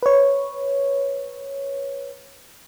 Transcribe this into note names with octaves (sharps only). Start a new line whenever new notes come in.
B4 C#5